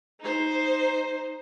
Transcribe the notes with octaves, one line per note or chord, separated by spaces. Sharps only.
D#4 C5